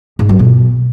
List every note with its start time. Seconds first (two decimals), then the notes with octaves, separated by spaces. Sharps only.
0.19 G#2
0.29 F#3
0.39 B2